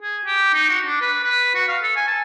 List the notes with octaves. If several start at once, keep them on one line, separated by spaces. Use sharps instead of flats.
G#4
G4
D#4
F#4
D4
B4
B4
F#4
F5
A4
G#5
A5